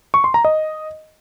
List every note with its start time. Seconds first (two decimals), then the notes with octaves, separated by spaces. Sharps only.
0.14 C#6
0.24 C6
0.34 A#5
0.45 D#5